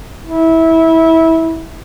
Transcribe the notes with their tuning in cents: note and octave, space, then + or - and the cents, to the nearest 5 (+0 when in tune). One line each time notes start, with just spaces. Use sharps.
E4 -20